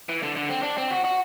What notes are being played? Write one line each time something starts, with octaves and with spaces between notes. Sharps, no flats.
E3
D3
D3
C4
D4
C4
F#4
F#4